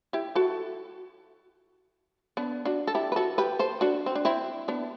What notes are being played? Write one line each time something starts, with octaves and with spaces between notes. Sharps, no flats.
E4 G4
F#4 A4
B3 D4
D4 F#4
A4
E4 G4
B4
F#4 A4
G4 B4
A4 C5
D4 F#4
C4
D4
C4 E4
B3 D4